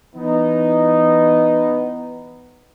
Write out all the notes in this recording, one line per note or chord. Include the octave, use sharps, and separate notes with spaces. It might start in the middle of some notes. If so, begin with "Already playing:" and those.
E3 B3 D#4